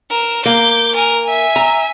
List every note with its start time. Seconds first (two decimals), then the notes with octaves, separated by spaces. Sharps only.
0.11 A#4 E7
0.46 A#3 D6 G6
0.95 A#4 G#5
1.24 E5 G#5
1.56 A#5